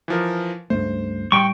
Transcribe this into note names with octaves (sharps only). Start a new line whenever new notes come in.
E3 F3 A#4
C#2 G2 A3 C5
A2 G3 G5 C#6